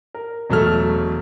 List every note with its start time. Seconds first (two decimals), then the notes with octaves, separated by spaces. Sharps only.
0.14 A#4
0.50 E1 F#3 A3 A4 F6